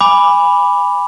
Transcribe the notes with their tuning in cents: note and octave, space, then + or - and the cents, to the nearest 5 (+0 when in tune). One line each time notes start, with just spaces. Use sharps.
G#5 -25 B5 +0 D6 +0